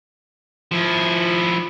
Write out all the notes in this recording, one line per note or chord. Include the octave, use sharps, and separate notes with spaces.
F3 E4